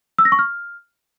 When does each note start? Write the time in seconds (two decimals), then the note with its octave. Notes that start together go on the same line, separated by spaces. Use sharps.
0.18 E6
0.25 A#6
0.32 C#6
0.39 F6